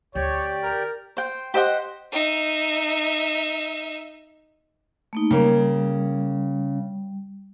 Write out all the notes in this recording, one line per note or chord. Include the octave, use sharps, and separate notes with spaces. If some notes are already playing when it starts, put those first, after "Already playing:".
D2 G4 C#5 D5 G5
A#4
C5 G5
G4 C5 D#5 F#5
D#4 E5
A3 A#3 D#4
C#3 G3 A#3